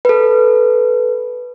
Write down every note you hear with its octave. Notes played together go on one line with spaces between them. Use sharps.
A4 B4